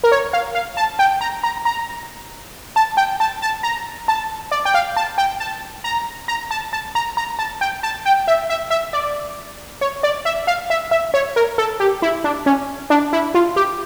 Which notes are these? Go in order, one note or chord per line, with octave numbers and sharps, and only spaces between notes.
A#4
C#5
F5
F5
A5
G5
A#5
A#5
A#5
A5
G5
A5
A5
A#5
A5
D5
G5
F5
A5
G5
A5
A#5
A#5
A5
A5
A#5
A#5
A5
G5
A5
G5
E5
E5
E5
D5
C#5
D5
E5
F5
E5
E5
C#5
A#4
A4
G4
E4
D4
C#4
D4
E4
F4
G4